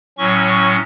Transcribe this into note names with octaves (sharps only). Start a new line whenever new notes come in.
A2 F#3 C#4 C#6
C#6